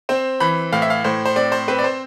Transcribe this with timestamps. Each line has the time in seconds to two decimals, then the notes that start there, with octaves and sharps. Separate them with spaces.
0.09 C4 C5
0.40 E3 B5
0.73 A2 F5
0.82 E5
0.90 F5
1.04 A2 C5
1.26 C5
1.36 C4 D5
1.52 C5
1.68 C4 B4
1.79 D5
1.84 C5